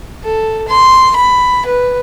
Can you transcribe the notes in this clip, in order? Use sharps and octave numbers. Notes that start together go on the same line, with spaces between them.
A4
C6
B5
B4